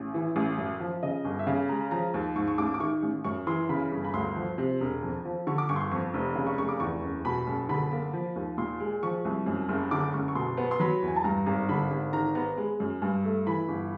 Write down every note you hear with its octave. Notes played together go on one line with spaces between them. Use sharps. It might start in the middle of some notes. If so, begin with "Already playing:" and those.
Already playing: A1
E3
A1
F#2
F3
C#3 D#5
G1
E5
C#3 F5
G#3 A#5
F3 A#5
D#2
G#2 C#6
C#6
A1 D6
D6
D#3 C#6
A1
F#2 C#6
E3 C6
C#3 B5
G1
B5
D2 C6
F3
C3
E1
F2
F3
D3 C#6
D6
G1 C#6
C6
C#6
F2 C#6
F1
C#3
C#6
F1 C#6
D6
E2 C#6
F#1
B2 B5
F#1
D3 B5
A#3
F3
D#2
A#2 C6
G#3
F3 C#6
C2
F#2
F#1
D3 D6
F#1 C#6
C#6
B2 C6
B3
C6
F#3 B5
E2
G#5
A5
G2 A#5
G#1 A#5
D3 B5
G#1
D#3 A#5
B3 A#5
G#3
F#2
G2
A3
E3 B5
G1